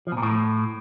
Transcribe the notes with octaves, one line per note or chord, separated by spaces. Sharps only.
F3
B2
A#2
A2